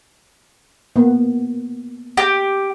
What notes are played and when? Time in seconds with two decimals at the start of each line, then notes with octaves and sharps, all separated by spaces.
0.96 A#3 B3
2.17 G4